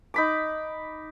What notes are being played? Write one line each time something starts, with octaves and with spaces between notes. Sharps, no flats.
D#4 B5 D6